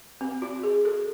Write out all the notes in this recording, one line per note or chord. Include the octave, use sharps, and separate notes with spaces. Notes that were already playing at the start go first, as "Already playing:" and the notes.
C4
F#4
G#4
A4